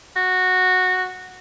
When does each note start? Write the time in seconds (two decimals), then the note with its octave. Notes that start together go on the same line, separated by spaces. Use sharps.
0.16 F#4